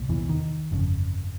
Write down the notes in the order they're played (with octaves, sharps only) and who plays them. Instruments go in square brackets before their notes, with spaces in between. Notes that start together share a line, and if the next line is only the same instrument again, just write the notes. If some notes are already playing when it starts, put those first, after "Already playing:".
Already playing: [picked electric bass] C2 A#2
E2 E3
D#3
G1 F2 C#3